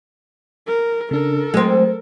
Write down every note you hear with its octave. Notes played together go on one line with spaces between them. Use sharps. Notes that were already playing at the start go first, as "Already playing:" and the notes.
A#4
C#3 D4 A4 A#4
F#3 G#3 A3 C4